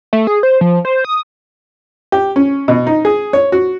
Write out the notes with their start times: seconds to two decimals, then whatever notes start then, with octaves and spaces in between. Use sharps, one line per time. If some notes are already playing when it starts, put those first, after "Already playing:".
0.13 A3
0.27 G#4
0.43 C5
0.61 F3
0.85 C5
1.05 D#6
2.12 G4
2.36 C#4
2.68 B2
2.87 D#4
3.05 G#4
3.33 C#5
3.52 F#4